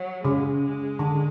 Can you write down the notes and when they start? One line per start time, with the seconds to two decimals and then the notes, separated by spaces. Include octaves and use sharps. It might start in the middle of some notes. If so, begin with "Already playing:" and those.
Already playing: F#3
0.25 C#3 G#3
0.99 D3